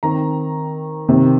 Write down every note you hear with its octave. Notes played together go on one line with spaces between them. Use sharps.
D#3 C4 A#5
C3 D#3 C4